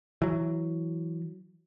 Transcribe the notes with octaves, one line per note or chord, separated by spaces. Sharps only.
E3 F#3